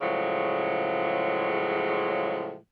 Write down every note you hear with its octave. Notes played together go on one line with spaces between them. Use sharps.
A2 C#3 F3 F#3 G#3